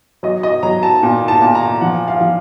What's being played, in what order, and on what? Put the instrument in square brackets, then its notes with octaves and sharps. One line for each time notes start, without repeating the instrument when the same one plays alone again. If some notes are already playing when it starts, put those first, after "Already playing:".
[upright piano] F#3 D#5
D#5
F#3 A#5
A5
A#2
A5
A#2
A#5
F3 F#5
F5
F3